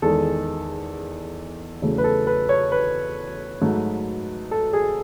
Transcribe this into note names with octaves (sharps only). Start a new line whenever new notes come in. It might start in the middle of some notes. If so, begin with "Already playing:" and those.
E2 D#3 G#3 A4
E2 C#3 F#3 A3
B4
A4
B4
C#5
B4
G#2 F#3 A3
A4
G#4